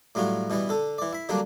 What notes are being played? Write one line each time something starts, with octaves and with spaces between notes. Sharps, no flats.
A2 F#3 G3 F4 F#4
B2 E3 G3 B3
D3 A4
E3 D5
E4 B5
D3 F#3 G3 A#3 D4